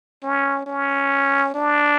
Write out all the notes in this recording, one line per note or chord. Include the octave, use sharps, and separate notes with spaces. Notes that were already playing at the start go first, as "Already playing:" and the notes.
C#4
C#4
D4